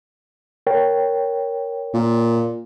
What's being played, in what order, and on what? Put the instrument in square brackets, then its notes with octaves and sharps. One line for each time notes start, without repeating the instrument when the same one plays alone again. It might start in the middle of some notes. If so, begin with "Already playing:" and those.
[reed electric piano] A#4 C#5 G5
[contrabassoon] A#2